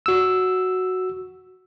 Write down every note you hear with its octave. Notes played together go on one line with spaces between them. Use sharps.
F#4 E6